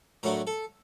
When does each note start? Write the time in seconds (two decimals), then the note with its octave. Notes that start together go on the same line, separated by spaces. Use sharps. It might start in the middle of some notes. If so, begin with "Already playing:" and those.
0.23 A2 F#3 A3 D4 A#4
0.47 A4